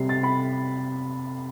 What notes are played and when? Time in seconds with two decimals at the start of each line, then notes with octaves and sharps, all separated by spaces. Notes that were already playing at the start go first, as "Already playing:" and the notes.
Already playing: C3 G3 C7
0.09 A6
0.23 B5